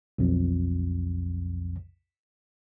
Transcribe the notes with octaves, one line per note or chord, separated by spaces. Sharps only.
B1 F2